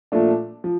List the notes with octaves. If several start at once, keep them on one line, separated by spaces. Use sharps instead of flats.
A#2 F3 A3 D4
F3